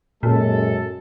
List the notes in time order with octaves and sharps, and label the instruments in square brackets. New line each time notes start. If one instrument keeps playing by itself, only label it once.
[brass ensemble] F#2 G#3 A4 [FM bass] A#2